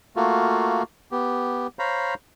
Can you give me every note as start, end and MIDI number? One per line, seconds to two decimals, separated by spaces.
0.16 0.83 57
0.16 0.83 58
0.16 0.83 65
0.16 0.83 66
1.12 1.67 59
1.12 1.67 67
1.79 2.14 72
1.79 2.14 73
1.79 2.14 77
1.79 2.14 82
1.79 2.14 83